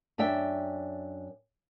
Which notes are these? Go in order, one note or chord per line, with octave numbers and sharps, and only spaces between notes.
F#2 D4 D5 E5 G5